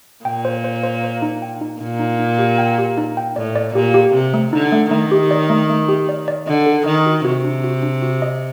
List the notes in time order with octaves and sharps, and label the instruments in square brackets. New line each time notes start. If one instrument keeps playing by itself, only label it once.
[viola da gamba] A#2 [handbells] G5
[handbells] C5
C5
C5
C5
D#4
G5
D#4
[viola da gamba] A#2 [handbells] D#4
[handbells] D#4
D#4
G4
G5
G4
D#4
G5
[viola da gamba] A2 [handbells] D5
[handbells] D5
[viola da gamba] A#2 [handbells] G4
[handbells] G4
[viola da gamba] C3 [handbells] G4
[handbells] A3
[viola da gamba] D3 [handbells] D#4
[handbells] A3
[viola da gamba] D#3 [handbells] A3
[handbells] G4
D5
A3
A3
G4
D5
D5
[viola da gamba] D3 [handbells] D#5
[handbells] A4
[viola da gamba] D#3 [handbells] D#5
[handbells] F#4
[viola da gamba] C3 [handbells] F#4
[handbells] D4
F#4
D4
F#4
D#5